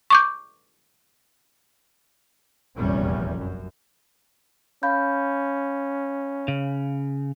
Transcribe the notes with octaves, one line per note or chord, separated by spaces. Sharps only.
C#6 D6 G6
F1 A#1 E2 G3 C#4
F#2
C#4 F5 B5 G6
C#3